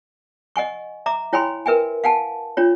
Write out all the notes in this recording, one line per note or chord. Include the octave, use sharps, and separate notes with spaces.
D#5 F#5 G#5 C#6
E5 A#5 D6
E4 C#5 G5 G#5 B5 C6
A#4 B4 E5 G5 G#5
F5 F#5 G#5 A5
D4 F4 C#5